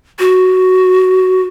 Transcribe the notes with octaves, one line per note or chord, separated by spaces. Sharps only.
F#4